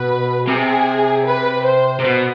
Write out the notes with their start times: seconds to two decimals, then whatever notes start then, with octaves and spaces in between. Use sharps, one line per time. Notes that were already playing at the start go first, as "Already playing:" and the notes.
Already playing: B2 B4
0.47 C3 G#4
1.26 B4
1.65 C5
2.00 C3
2.05 B2